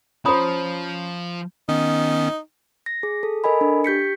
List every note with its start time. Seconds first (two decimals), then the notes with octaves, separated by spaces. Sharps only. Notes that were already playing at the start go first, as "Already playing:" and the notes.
0.25 F3 C#4 C5 A#5 B5 D#6
1.69 D#3 B3 C#4 D#4
2.86 A#6
3.03 G#4
3.23 A4
3.44 A4 A#4 D#5 G#5 B5
3.61 D4
3.84 G4 G6 B6 C#7